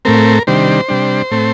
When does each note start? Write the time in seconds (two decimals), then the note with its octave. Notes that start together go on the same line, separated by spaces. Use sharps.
0.05 A2 A3 C4 A#4
0.47 C3 D#3 G3 D4 C5
0.89 C3 G3 D4
1.31 A2 A3 C4